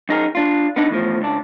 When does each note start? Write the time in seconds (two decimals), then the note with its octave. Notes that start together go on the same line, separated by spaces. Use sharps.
0.09 F#2 D#4 G#4 A#4
0.35 D4 F4
0.76 B3 D4 D#4 B4
0.90 E2 A2 F3
1.21 C#2 D4